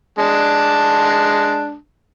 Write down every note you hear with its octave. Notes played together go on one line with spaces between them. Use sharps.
G#3 D4 A5